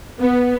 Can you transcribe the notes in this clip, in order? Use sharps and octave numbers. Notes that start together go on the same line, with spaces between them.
B3